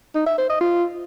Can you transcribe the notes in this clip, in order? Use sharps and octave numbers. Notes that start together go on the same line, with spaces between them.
D#4
E5
C5
D#5
F4